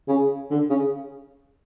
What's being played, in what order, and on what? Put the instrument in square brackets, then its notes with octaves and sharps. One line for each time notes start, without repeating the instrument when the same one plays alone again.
[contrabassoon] C#3
D3
C#3